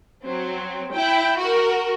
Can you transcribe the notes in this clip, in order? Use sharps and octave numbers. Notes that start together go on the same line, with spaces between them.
F#3 C4
E4 G5
F#4 A#4